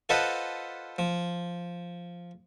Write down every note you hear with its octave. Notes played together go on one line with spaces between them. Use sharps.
F4 A4 B4 C5 D#5 F#5
F3